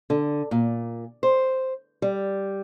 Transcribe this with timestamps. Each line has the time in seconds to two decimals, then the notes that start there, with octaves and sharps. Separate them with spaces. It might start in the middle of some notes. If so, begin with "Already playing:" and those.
0.10 D3
0.51 A#2
1.23 C5
2.02 G3